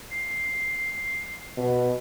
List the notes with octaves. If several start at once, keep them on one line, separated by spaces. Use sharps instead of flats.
C7
B2